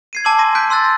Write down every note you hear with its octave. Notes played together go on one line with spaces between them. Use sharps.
G#6 C7 D#7
G#5 A5 D6 E6 F#7
C6 D6 A#6 D#7
F#6 G6 B6 D7
C6 E6 F#6 A6
A6 A#6